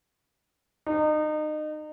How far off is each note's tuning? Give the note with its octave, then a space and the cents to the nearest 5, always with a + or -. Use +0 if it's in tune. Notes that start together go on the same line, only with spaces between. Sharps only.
D#4 -30